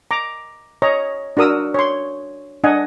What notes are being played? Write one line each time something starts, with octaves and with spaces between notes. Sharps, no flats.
A#5 D6
C#5 D#5 A#5
D4 F#4 A#4 D#6 E6
C#5 C6
D4 D#5 F#5 G#5